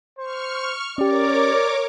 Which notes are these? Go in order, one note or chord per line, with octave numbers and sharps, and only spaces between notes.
C5 C#6 F6
C#4 G4 A#4 C#5 D5 D6